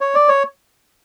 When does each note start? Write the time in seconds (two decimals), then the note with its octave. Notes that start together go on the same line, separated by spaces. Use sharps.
0.01 C#5
0.15 D5
0.28 C#5